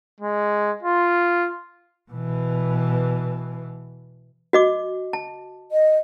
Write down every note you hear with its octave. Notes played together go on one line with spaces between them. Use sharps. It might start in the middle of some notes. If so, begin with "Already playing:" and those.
G#3
F4
B2 E3
F#4 D#5 D6
A5
D#5